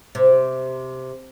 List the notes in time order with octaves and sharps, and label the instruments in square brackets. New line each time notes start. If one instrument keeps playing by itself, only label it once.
[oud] C3